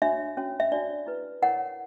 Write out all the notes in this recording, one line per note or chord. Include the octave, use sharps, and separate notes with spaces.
D4 F#4 C#5 E5
C#4 F#4 C#5
E5
D4 F#4 C#5 D5
E4 B4
E4 A#4 C#5 F#5